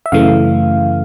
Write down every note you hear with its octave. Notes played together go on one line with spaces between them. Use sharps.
E5
F#2 C#3 E3 A3 F5